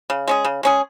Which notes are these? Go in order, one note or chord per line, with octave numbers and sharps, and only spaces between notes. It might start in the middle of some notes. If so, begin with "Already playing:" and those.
C#3
G#3 C#4 G#4
C#3
G#3 C#4 G#4